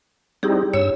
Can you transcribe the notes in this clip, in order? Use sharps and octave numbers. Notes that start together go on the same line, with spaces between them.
G3 C4 D#4 E4 G4 G#4
G2 C#5 E6